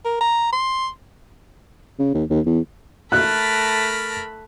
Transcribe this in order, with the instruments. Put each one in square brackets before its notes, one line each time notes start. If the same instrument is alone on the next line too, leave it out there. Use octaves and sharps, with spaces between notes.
[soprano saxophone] A#4
A#5
C6
[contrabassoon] C#3
D#2
D#2
E2
[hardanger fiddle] A3 B5 [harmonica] A#4 A5 [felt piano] F#6